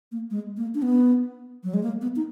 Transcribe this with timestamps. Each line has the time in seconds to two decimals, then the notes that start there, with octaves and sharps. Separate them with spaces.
0.12 A#3
0.31 G#3
0.57 A#3
0.75 D4
0.82 B3
1.64 F#3
1.74 G#3
1.83 A#3
2.01 B3
2.16 D#4